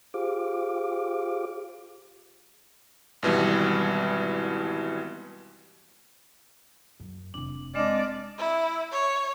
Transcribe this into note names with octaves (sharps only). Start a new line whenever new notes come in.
F4 G4 G#4 C5 F5 D6
G#1 B2 E3 G3
F#2
F1 C3 D4
G#3 C4 D4 D5 D#5 F6
E4
C#5